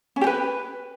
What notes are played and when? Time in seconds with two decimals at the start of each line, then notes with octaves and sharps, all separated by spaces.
0.16 C#4
0.21 G4
0.27 B4